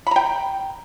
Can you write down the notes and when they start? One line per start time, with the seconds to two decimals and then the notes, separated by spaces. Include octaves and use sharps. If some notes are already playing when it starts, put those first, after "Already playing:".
0.07 B5
0.11 A#5
0.16 G5